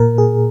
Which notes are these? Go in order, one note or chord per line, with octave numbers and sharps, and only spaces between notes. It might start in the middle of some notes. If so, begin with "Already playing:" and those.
Already playing: A#2 A#4
G#4